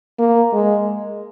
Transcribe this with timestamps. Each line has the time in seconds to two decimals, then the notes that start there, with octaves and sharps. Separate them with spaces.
0.19 A#3
0.53 G#3